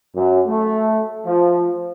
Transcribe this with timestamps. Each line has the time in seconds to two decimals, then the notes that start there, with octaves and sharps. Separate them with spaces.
0.16 F#2
0.47 A3
1.26 F3